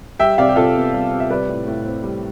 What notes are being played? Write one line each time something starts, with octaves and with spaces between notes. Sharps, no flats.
G3 E5 G5
C3 D5 F5
G4
C3 F4 A4
B3
G3
C3
E5
G3 B4 D5
A2
A2
C4
G3